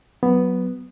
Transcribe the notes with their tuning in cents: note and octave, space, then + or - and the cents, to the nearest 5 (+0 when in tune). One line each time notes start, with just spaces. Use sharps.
F#3 +0 B3 +0